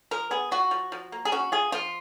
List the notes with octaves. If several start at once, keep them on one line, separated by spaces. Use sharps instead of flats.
F3 A#4
B3 G#4
F4 F#4
F3
F3
A#3
G#4
C#4 F#4
F4 G#4
F3 F4